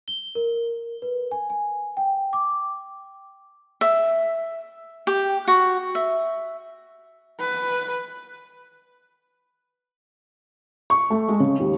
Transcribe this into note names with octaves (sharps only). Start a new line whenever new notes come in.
G7
A#4
B4
G#5
G#5
G5
D6
E5
G4
F#4
E5
B4
C#6
A3
G#3
C#3
D#2